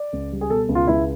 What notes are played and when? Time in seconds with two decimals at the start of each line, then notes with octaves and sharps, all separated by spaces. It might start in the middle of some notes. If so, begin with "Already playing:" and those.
Already playing: D5
0.13 C#2
0.32 G3
0.41 G#4
0.50 B2 A4
0.69 C#2
0.75 F4
0.87 C#2 E4